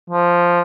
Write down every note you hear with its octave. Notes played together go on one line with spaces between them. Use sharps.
F3